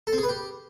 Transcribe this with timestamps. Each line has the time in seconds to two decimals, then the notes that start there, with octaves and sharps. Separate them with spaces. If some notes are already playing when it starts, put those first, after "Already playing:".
0.07 A4
0.13 C4
0.18 G#4
0.23 B4
0.29 G4